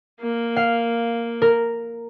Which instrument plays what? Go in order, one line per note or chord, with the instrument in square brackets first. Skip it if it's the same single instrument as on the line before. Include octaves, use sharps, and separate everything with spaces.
[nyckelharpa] A#3
[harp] F5
A#4